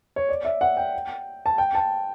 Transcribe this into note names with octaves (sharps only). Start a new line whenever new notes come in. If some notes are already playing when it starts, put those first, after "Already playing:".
C#5
D5
E5
F#5
G5
A5
G5
A5